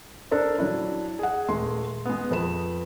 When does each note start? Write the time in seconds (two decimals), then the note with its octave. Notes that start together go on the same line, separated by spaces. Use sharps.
0.31 D4 A4 A#4 C5
0.58 F#3 D4 E4
1.19 G#4 F#5
1.49 D#1 G#3 A3 C6
2.06 G#3 B3
2.31 F2 B4 E7